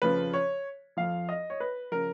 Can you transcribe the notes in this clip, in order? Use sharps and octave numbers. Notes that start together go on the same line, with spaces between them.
F2 C#3 F3 B4
C#5
F2 F3 F5
D#5
C#5
B4
C#3 F3 A#4